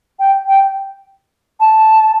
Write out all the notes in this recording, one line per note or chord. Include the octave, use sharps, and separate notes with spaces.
G5
G5
A5